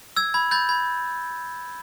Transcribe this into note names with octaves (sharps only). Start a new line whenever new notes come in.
E6 G#6
B5 G#6
B5 G6 A6
B5 G#6